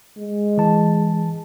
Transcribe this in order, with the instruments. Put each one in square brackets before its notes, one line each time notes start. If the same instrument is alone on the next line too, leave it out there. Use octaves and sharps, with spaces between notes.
[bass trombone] G#3
[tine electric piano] E3 A5